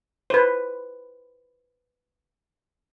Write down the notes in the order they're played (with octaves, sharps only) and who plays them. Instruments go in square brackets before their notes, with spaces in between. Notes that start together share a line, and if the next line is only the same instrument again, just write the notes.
[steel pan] B4 C5